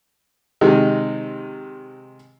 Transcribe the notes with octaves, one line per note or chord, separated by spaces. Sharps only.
C3 D#3 G#3